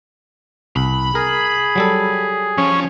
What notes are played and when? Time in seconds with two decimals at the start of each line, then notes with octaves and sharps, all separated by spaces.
0.76 C2 B5
1.15 G#4 A#4
1.76 F#3 G3 A4
2.58 F3 C#4